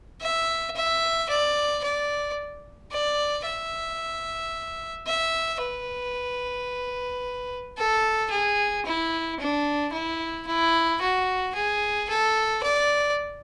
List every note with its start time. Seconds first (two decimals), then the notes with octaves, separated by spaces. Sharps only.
0.21 E5
0.76 E5
1.29 D5
1.84 D5
2.92 D5
3.46 E5
5.07 E5
5.61 B4
7.78 A4
8.31 G#4
8.85 E4
9.39 D4
9.93 E4
10.47 E4
11.01 F#4
11.55 G#4
12.09 A4
12.63 D5